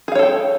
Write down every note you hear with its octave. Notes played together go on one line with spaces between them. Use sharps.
G#4 A4 C#5 F5 G5